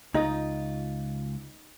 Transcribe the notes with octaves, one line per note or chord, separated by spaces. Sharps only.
C#2 D#4 F4 D#5